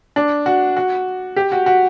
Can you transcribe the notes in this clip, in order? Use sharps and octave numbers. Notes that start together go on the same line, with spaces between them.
D4
F#4
F#4
G4
F#4
F#4